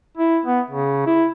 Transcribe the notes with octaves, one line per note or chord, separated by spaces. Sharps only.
E4
B3
C#3
E4